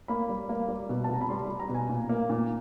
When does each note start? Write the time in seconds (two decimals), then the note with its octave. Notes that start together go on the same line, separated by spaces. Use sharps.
0.08 A#3 B5
0.29 G3
0.49 A#3
0.68 G3
0.89 B2
1.04 A5
1.09 C2 A#5
1.21 B5
1.29 G3 C6
1.44 B5
1.49 G3
1.59 A#5
1.69 B2
1.74 G#5
1.89 A#2
2.09 A#3
2.30 A#2